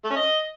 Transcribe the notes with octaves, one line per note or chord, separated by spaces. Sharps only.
A3
C#4
D#5